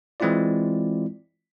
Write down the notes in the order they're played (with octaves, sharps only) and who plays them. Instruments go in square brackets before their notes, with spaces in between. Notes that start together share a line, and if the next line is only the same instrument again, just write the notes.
[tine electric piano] E3 G#3 C4 E4 F4 D5